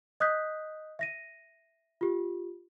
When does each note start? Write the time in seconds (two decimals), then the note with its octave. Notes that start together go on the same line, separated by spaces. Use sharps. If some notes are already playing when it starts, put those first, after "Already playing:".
0.20 D#5 D#6 F#6 G6 B6
0.99 E5 A#6 D#7
2.01 F4 G4